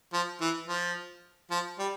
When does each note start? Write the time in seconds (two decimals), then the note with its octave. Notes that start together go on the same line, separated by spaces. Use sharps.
0.13 F3
0.41 E3
0.68 F3
1.51 F3
1.79 G3